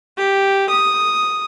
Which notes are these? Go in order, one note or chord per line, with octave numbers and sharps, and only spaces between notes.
G4
D#6